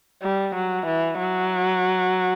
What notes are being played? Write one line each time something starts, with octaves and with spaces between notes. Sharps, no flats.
G3
F#3
E3
F#3